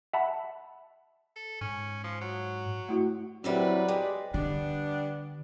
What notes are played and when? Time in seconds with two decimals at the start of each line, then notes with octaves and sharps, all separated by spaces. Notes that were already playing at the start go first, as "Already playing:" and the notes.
0.13 E5 F#5 A5 B5
1.36 A4
1.61 G#2 C#4
2.04 F3
2.21 F#3
2.89 A3 E4 F#4
3.44 D#2 C3 F#3 G3 C4 E4 B4 D5
3.88 G#3 G4
4.34 D3 G3 B3 D4